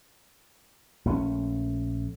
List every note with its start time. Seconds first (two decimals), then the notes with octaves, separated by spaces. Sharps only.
1.05 A#1 A3 C4 C#4